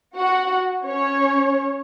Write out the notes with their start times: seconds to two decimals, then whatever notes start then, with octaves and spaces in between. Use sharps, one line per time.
0.16 F#4 F#5
0.85 C#4 C#5